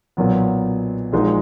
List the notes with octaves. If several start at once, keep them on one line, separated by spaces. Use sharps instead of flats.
B1 A#2 F#3 B3
A#1 A#2 G#3 D#4 F#4